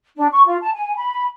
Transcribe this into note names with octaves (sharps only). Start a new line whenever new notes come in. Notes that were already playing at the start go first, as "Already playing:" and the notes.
D4
C#6
F4
A5
G#5
B5